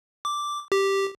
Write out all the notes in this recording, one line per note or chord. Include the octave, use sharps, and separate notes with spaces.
D6
G4